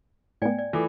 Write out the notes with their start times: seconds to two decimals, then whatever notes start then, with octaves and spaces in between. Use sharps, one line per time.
0.42 A2 B3 D5 G5 G#5
0.59 D5
0.73 E3 A3 F4 A4 D6